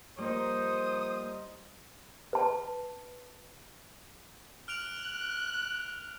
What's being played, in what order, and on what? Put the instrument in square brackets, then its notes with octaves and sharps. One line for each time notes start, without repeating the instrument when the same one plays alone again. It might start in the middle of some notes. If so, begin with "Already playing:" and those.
[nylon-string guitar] F3 A#3 D#5 [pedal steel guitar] G3 D#4 [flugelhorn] C5 [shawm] D#6
[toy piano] B4 A5
[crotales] F6 D7 F7 [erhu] F#6